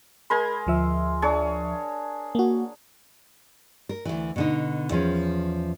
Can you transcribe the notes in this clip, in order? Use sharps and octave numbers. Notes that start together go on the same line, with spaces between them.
G#3 A#4 B5 C6 G#6
D2 F3 E5
D4 G#4 C#5
A#3 F#4
A#4
D2 E3
B2 D3 D#4
E2 F3 C#4